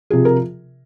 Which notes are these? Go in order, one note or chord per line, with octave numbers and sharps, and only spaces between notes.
C3 F3 G#4
A#4